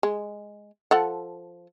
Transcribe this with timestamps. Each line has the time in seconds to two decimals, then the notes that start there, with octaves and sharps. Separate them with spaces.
0.03 G#3
0.91 F3 A4 F#5